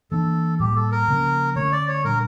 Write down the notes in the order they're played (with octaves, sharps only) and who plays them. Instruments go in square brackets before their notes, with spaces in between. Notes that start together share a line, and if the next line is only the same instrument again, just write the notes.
[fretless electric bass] E3 A#3 D4 [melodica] A4
[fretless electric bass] A2 G3 A#3 [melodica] G4
[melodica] A4
A#4
[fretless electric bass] C#3 F3 A#3 C#4
[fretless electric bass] D3 A3 C#4 [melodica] C#5
[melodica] D5
C#5
[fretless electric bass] A#2 G3 D4 [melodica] A#4